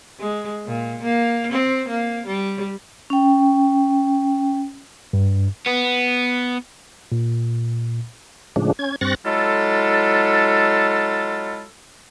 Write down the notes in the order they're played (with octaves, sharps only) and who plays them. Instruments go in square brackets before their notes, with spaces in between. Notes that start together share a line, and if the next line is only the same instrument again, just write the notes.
[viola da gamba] G#3
A#2
A#3
C4
A#3
G3
[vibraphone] C#4 G5
[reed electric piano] G2
[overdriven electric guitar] B3
[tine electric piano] A#2
[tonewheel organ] A2 C#3 F3 G#3 D4
C#4 G#6
G2 C4 C#6 F#6 A6 A#6
[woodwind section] F#3 G#3 E4 F4 A4